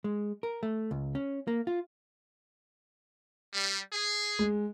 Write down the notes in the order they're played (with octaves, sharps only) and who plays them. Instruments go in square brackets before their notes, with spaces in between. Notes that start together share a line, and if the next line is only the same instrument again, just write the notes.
[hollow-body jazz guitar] G#3
A#4
A3
C#2
C#4
A#3
F4
[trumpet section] G3
G#4
[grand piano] G#3